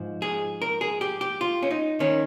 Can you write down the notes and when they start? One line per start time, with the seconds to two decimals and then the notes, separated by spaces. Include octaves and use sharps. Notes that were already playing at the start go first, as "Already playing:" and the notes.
Already playing: G#2 F3
0.22 G#4
0.62 A#4
0.81 G#4
1.01 G4
1.21 G4
1.41 F4
1.63 C#4
1.71 D#4
2.00 D#3 C#4